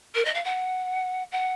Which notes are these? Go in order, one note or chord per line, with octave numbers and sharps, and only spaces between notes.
A#4
D#5
F5
F#5
F#5